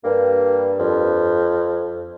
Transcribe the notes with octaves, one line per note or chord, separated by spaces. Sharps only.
G2 A#3
F2